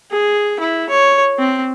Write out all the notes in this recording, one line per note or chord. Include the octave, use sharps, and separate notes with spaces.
G#4
E4
C#5
C4